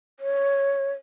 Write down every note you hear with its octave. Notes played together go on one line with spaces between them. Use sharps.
C#5